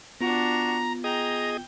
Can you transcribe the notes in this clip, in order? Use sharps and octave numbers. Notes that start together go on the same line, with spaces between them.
B3 D4 F4 F#4 A#5
G#4 D#5 G5 A#5